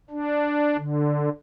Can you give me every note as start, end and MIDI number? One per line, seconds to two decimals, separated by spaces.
0.11 0.77 62
0.77 1.29 50